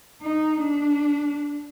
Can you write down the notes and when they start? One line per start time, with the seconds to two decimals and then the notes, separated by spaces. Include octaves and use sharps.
0.22 D#4
0.62 D4